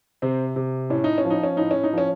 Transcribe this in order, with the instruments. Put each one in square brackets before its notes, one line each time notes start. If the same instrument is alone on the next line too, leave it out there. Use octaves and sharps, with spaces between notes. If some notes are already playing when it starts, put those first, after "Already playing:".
[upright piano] C3 C4
C3
A2 C#4
D#4
C#4
F3
D#4
C#4
A2 D#4
C#4
D#4
F3 C#4